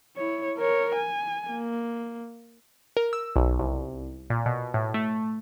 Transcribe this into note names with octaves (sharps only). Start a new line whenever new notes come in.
E4 C#5
A#4 C#5
G#5
A#3
A#4
E6
B1
C2
A#2
B2
A2
A3